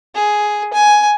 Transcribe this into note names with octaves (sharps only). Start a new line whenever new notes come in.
G#4
G#5